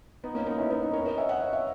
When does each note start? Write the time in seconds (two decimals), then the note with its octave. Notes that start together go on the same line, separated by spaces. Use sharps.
0.24 B3 D#4
0.35 A#3 C#4
0.47 B3 D#4
0.58 C#4 E4
0.70 B3 D#4
0.82 B3 D#4
0.93 A#4 C#5
1.06 B4 D#5
1.17 C#5 E5
1.29 D#5 F#5
1.41 C#5 E5
1.53 C#5 E5